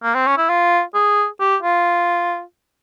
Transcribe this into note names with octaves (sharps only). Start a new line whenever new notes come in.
A#3
C4
C#4
E4
F4
G#4
G4
F4